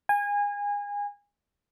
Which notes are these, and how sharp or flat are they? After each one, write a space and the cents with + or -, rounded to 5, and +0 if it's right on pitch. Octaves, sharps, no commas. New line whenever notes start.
G#5 -25